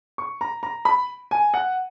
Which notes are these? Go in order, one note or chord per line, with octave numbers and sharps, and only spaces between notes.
C#6
A#5
A#5
B5
G#5
F#5